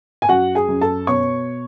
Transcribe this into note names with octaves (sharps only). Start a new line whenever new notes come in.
G#5
F#2 F#4 F#5
G#4 G#5
F#2
A4 A5
B2 C#5 C#6